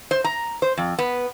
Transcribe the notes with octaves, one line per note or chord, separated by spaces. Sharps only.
C5
A#5
C5
F2
B3